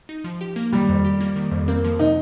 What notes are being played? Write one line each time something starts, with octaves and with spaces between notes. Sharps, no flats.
D#4
F3
G4
A#3
D#3 G3
F2
G4
A#3
D#3
F2
A#3 C4
F3
C3 D#4